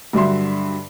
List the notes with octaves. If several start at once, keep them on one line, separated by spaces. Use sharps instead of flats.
G2 D3 F#3 E5 C6